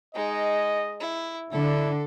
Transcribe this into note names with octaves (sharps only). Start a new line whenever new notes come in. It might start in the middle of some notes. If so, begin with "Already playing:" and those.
G#3 D#4 D#5
E4
D3 D4 E4 A4